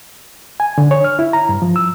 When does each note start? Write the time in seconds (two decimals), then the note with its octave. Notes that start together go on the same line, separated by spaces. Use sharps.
0.60 G#5
0.78 D3
0.91 C#5
1.04 F6
1.19 E4
1.33 A#5
1.49 G2
1.62 F3
1.76 E6